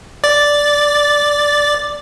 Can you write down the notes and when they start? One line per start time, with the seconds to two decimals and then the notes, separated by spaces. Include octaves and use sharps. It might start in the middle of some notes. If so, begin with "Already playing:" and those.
0.24 D5 A6